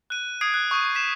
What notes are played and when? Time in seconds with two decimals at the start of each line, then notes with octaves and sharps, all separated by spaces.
0.10 F#6 D#7
0.41 D#6 G#6 C7 D7
0.54 F#6
0.71 C#6 D#6 G6 G#6 D#7
0.95 B6 E7